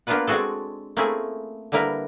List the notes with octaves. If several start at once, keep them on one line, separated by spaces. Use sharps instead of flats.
A#3 B3 D4 F4 B4 F#5
G#3 C4 D4 F#4 G#4 A4
A3 A#3 C4 C#4 E4 G#4
D3 G3 A#3 E4 A#4 B4